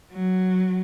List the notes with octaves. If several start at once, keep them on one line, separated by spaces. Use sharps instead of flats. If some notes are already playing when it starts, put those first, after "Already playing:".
F#3